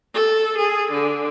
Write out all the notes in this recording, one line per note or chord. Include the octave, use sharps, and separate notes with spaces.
A4
G#4
D3